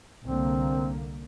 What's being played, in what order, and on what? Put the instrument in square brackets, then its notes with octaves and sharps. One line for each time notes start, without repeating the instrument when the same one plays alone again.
[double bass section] C2 D3 A#3 [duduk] C4